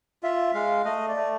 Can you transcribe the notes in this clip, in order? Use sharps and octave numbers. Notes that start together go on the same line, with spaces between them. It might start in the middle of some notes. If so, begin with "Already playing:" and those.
F4 E5
G#3 F5
A3 D#5
D5
A3